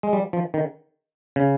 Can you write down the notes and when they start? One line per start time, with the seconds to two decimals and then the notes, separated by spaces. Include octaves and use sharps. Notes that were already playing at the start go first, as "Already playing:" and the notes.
0.03 G#3
0.13 G3
0.33 F3
0.54 D#3
1.36 C#3